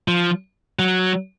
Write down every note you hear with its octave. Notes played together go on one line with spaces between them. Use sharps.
F3
F#3